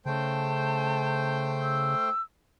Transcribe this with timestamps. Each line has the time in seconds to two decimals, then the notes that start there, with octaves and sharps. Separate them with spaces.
0.06 C#3 A3 C5 G5 A5
1.63 E6